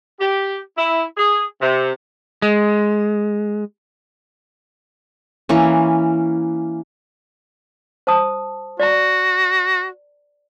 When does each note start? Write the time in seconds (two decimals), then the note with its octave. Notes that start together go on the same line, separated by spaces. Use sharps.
0.19 G4
0.77 E4
1.17 G#4
1.61 C3
2.42 G#3
5.49 E3 A#3 C#4
8.07 C5 A5 D#6
8.80 F#4 D5 A#5